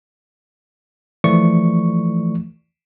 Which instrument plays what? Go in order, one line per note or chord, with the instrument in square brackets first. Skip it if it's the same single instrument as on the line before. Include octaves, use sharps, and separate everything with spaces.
[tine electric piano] E3 F3 A3 D5 C#6